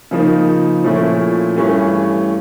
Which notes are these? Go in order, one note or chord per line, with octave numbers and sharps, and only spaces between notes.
C#3 F3 A#3 D#4
A#2 F3 A3 C#4 E4
G2 E3 A3 C#4